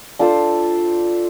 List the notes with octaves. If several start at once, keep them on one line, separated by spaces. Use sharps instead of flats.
D4 F4 A4 C5